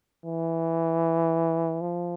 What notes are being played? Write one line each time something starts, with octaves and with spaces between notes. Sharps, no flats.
E3
F3